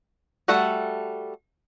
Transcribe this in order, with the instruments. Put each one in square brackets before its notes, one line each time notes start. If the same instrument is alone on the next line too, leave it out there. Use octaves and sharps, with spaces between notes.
[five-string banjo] G3 A3 F#4 A4 F#5